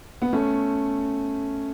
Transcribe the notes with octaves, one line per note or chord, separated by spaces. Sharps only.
B3
A3 C#4